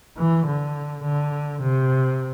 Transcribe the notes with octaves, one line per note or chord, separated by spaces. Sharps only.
E3
D3
D3
C3